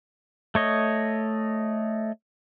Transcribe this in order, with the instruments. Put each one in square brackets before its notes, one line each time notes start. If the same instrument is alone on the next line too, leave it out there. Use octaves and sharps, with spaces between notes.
[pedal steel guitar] A3 C#5 D#5